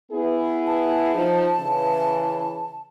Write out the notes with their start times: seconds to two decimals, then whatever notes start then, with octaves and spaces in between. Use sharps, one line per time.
0.12 B3 E4 G#4
0.67 A5
1.15 F3 D#4
1.59 C#3 E3